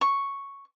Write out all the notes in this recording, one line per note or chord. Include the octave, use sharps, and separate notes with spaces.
C#6